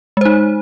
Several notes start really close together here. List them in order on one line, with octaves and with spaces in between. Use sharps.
G#3 C5 D#4